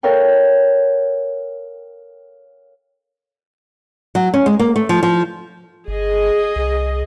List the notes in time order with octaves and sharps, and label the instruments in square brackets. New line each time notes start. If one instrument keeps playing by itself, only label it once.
[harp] A4 A#4 C#5 F5 G5
[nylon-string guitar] F#3
C#4
G#3
A#3
A3
F3
F3
[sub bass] G1 [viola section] G#4 D#5
[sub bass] C2